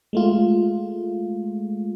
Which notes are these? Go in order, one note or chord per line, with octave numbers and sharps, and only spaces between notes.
G#3 A3 F4